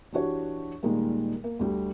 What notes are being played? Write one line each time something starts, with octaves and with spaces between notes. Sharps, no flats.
E3 D4 F#4 G4 C#5
A#2 D#3 G3 G#3 A#3
A#3
D2 G3